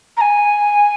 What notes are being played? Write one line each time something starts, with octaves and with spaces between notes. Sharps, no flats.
A#5
G#5